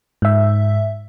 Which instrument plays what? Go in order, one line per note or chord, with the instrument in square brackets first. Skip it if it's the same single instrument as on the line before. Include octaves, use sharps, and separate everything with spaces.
[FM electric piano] G#2 E5